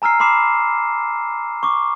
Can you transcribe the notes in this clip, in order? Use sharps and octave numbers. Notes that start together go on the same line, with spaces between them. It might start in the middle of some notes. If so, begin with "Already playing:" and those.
G#5 A#5 E6 F6 C7
B5 C6 D6 C7 E7
C#6 D6